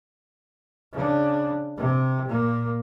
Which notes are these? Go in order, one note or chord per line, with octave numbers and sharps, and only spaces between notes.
C#3 D4
C3
A#2 A#3